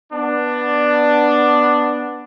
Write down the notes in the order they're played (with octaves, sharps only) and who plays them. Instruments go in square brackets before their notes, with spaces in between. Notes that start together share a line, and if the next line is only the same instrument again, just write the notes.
[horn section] B3 D4